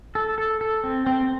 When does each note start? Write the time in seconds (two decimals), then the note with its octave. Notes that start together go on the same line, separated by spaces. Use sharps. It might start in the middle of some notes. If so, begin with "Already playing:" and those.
0.15 A4
0.38 A4
0.61 A4
0.84 C4
1.07 C4